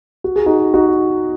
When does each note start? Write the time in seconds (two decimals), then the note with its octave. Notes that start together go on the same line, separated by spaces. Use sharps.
0.24 F#4
0.36 G#4
0.46 D#4 F#4
0.74 D#4 F#4